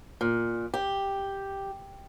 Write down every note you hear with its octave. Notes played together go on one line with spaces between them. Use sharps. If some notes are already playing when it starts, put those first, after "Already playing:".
A#2
G4